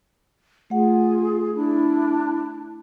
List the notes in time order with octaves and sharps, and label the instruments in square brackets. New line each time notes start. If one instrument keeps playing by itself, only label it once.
[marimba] A3 F#5 [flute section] F4 G#4
[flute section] D4 E4